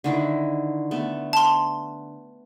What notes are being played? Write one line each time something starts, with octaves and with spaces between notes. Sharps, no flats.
D3 D#3 E4
A3 B3
A5 C6